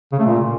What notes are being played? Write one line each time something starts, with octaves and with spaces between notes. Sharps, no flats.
C#3
A3
A#2